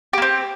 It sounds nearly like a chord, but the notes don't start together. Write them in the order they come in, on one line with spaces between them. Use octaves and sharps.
G4 A#3 C4